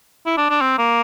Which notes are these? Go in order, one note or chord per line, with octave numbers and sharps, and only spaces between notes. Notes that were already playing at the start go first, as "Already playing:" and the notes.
E4
D4
D4
C4
A#3